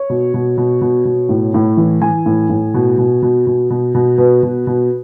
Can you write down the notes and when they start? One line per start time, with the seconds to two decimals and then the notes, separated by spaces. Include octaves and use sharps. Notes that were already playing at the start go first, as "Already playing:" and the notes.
Already playing: C#5
0.10 B2
0.34 B2
0.58 B2
0.81 B2
1.05 B2
1.29 A2
1.54 A2
1.77 E3
2.02 E3 G#5
2.26 A2
2.49 A2
2.74 B2
2.98 B2
3.23 B2
3.47 B2
3.70 B2
3.95 B2
4.18 B2 B4
4.43 B2
4.67 B2